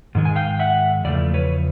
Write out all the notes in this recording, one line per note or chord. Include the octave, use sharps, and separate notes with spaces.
G#2 D#3 G#3
G#5
F5 G5
E5 F#5
E2 C#3 F3 A3 D5
B4 C#5